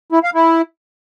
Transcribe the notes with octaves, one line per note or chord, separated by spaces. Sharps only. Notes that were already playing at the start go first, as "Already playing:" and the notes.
E4
F5
E4